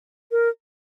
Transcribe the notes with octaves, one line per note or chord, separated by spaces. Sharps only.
A#4